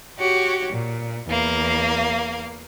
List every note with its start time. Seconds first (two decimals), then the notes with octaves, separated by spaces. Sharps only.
0.18 F#4 G4 C#5
0.72 A#2
1.29 E2 A#3 F5